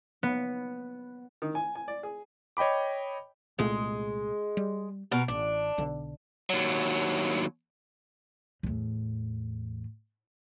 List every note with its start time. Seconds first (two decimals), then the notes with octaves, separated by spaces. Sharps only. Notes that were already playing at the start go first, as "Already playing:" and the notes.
0.23 B3
1.42 D#3
1.55 G#5
1.75 G#5
1.88 D5
2.03 G#4
2.57 C#5 D#5 G5 B5 D6
3.59 C2 A#2 G#3 A3
4.57 G3
5.11 B2 A#4
5.28 A1 D4
5.78 B1 D3
6.50 D#2 F#3
8.63 E2 A2